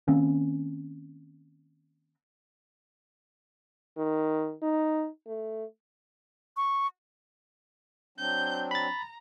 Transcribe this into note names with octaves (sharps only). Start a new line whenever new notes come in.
D#3 A#3 C4 C#4
D#3
D#4
A3
C#6
F#3 C4 D4 G6
A#5 B5 A6